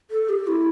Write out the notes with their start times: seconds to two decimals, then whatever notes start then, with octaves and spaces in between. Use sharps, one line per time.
0.11 A4
0.29 G4
0.47 E4